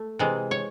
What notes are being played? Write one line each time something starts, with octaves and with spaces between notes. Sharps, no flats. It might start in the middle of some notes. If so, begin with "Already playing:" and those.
Already playing: A3
C3 E3 G#3
C#5